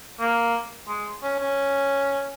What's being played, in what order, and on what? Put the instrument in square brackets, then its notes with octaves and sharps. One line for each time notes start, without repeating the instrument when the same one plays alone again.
[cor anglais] A#3
G#3
C#4
C#4